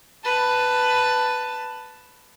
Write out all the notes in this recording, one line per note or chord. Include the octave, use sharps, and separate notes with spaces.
B4 A5